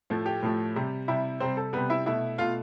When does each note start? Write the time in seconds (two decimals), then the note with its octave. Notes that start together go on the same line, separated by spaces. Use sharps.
0.10 A2 F3 A3
0.26 G4
0.43 A2 F3 A3
0.76 C3 G3
1.08 C3 G3 E4 E5
1.40 C3 G3 C4 C5
1.57 A4
1.73 C3 G3 B3 B4
1.90 E4 E5
2.06 B2 A3 E4 E5
2.38 B2 A3 F4 F5